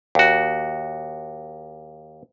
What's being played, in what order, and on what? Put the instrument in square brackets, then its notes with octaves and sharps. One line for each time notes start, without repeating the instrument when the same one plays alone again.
[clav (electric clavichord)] D#2 F#4